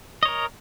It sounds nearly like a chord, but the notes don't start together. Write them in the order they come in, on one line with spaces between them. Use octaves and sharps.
D#5 C#5 A#4